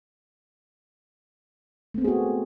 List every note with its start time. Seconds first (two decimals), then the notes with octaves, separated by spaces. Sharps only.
1.94 A3
1.98 C4
2.01 B3
2.04 G#4
2.08 F#4